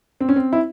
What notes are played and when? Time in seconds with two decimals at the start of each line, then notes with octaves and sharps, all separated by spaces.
0.21 C4
0.29 C#4
0.36 C4
0.53 E4